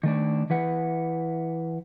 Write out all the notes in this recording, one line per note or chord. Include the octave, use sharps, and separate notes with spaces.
D#3 A3 D4
E3 B4 F#5